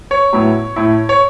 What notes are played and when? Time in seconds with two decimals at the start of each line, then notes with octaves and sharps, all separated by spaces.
0.11 C#5
0.33 A2 F#3 B3 E4
0.76 A2 A3 E4
1.09 C#5